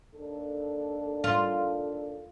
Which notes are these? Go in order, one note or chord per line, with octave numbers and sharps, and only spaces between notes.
D#2 D4 A4
F4